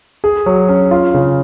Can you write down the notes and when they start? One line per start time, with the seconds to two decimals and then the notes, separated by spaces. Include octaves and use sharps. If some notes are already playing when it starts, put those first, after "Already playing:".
0.24 G#4
0.46 F#3
0.69 C#4
0.91 F4
1.14 C#3